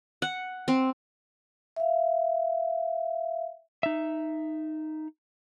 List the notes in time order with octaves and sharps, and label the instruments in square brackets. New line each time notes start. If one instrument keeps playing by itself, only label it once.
[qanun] F#5
C4
[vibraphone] E5 F5
[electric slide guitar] D#4 E5